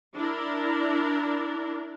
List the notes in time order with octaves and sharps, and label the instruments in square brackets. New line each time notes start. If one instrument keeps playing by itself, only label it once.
[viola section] D4 E4 A#4